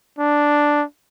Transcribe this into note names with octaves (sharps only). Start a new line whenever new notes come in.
D4